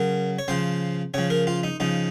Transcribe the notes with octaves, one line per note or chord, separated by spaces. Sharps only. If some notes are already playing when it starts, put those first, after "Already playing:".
Already playing: C#3 F#3 A#4
C#5
C#3 F3 C5
C#3 F3 C#5
A#4
F4
D#4
C#3 F3 D#4